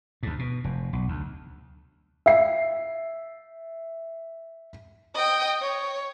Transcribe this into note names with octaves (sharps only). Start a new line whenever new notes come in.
D2 G#2
B2
F1
B1
D2
E5 C7
D#5 G5
C#5